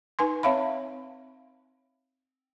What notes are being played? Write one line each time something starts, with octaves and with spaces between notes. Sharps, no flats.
D#4 B4 G#5 C6
C4 C#5 E5 F5 B5